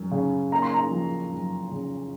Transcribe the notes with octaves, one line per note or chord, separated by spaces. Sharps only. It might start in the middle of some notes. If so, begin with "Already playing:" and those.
Already playing: F#2
C#3
A#3 A#5
C6
A#5
F3
F#2
C#3